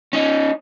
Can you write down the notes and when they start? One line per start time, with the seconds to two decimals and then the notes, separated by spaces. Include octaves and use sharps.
0.13 C#4 D#4